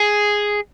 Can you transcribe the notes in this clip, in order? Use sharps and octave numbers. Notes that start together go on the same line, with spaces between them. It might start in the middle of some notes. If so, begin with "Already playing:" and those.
Already playing: G#4